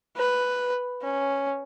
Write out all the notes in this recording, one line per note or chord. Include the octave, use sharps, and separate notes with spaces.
B4
C#4